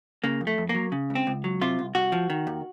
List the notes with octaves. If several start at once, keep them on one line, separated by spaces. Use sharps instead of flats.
C#3 A#3
F2
A3
F2
A#3
F#3
C#3
C#2
C4
C#2
F#3
C3 F4
C2
C2 F#4
F3
D#3
D#2